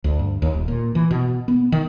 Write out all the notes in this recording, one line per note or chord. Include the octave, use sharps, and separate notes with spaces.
D2
G2
D#2
D#1
A#2
E3
B2
B3
D#3